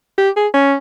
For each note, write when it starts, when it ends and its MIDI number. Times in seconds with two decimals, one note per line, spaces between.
0.18 0.30 67
0.36 0.47 68
0.54 0.75 61